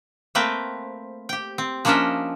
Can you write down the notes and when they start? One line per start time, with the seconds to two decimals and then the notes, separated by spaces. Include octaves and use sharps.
0.35 A3 A#3 C4 B4 G5
1.29 G4 G5
1.58 C4
1.85 F3 A#3 C#4 D4 D#5 E5